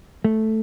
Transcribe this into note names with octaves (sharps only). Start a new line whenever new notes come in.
A3